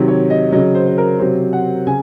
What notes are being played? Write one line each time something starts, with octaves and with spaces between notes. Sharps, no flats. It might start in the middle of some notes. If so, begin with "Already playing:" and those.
Already playing: C3 D#3 F#3
C#5
D#5
C#3 F#3 D#5
C5
C5
A#4
C3 F#3 C5
F#5
C#3 G#5